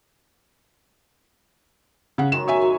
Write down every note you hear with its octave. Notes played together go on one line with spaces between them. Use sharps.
C#3 F#5
F#2 D#3 G#3 E7
C#5 E5 G#5
F#2 F#3 G#4